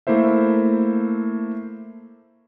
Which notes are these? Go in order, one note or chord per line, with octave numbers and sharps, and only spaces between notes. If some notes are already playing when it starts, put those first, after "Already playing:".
A3 A#3 E4 C5 E5